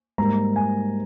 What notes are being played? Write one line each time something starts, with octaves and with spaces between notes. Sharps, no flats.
G#2 G3 A#3 A#5
G#5